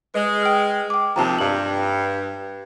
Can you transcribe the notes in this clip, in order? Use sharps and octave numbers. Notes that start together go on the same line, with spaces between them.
G#3 B4
G5 F6
G5 D6
D#2 C3 F3 A5 A#5
G2 F#7